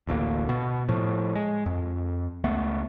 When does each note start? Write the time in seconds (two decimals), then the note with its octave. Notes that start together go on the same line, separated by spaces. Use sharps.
0.07 D1 A1 D2 A#3
0.49 B2 B3
0.89 A2 F3
1.36 G#3
1.66 F2
2.44 C#2 A3 B3